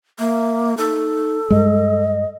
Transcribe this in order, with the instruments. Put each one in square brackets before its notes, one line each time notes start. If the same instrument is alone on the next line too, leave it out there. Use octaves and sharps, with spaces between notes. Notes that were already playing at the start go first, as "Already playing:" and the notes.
[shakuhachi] A#3 [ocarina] E5
[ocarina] D#4 [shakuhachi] A4
[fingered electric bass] G2 G#3 [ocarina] D#5